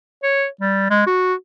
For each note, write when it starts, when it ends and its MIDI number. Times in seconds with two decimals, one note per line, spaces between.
0.23 0.46 73
0.61 0.86 55
0.91 1.04 56
1.07 1.34 66